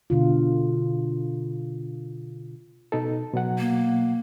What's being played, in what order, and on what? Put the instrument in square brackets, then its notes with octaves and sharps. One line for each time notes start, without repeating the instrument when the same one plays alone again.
[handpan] B2 D3 F4
[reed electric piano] B2 D#4 A4
B2 F#3 F#5
[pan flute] A#3